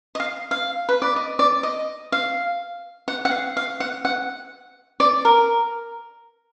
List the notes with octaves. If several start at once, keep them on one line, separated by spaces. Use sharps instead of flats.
D#5
F5
F5
B4
D5
D#5
D5
D#5
F5
F#5
F#5
F5
F5
F#5
F#5
D5
A#4